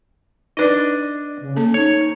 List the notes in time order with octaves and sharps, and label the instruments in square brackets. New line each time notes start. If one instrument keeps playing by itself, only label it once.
[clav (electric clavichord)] D4 D#5 [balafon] D#4 B4 D5
[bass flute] C#3
[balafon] A#3 A4 [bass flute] C#4
[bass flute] D#4 [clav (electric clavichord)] C#5